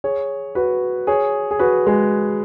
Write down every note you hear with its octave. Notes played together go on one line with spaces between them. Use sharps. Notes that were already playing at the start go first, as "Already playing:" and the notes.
G#4 C#5
F#4 B4
G#4 C#5
G#4
F#4 B4
G#3